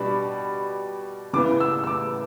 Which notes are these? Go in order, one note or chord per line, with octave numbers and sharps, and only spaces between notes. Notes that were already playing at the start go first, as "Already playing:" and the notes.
Already playing: B2 G3 D4 B5
C#3 E3 B3 D6
E6
E6
D6